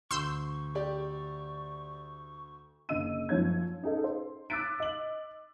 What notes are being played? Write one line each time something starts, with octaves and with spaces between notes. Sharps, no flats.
D2 C6 C#6 E6 G6
G4 D5
F#1 D3 D#5 E6 D#7
F#2 F3 C#5 G#6
C#4 D#4 G#4 A4 D#5
C5
D6 E6 F#6 A6 B6 D7
D#5 F#7